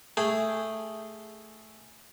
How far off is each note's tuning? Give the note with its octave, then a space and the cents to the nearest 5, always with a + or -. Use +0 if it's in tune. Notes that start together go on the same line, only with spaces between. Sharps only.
A3 +0 G#4 -5 G5 -5